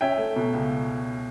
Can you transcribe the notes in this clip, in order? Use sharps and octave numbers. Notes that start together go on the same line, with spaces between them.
C#4 E5 G5
A3
B2
C#2